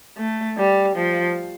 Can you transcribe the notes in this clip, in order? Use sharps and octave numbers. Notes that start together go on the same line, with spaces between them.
A3
G3
F3